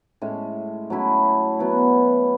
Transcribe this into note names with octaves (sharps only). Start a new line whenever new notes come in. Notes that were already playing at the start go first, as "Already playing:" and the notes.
A2 G#3 C#4
F#3 A3 C#4 E4
F#3 B3 E4